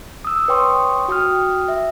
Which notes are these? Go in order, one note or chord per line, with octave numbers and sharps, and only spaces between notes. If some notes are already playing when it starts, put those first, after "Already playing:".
D#6 E6
B4 C#5 G5 C6 C#6 D#6
F#4 G5 D#6 F6
E5